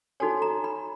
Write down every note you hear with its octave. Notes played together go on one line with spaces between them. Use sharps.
D#4 F#4 A4 C#5 G#5
A#5
B5